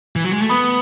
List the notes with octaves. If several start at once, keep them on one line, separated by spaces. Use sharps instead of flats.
E3
F#3
G#3
A3
B3 B5 D#6